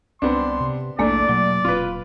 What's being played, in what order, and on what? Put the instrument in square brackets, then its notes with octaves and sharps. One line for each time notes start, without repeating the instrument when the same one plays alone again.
[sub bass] C2 [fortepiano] B3 C4 D4 [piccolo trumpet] C6
[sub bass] C3
[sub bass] A#1 [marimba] E2 G#2 A#3 [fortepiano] A3 D4 [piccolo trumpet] D5
[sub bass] B2 [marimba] F#3
[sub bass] D#1 [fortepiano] F4 B4